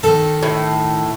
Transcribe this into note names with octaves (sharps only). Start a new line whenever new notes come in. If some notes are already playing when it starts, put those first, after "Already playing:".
D#3 A4
A2